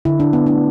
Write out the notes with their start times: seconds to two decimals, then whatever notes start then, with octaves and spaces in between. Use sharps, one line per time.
0.05 D3 E4
0.20 D4
0.33 B3
0.46 A3 D4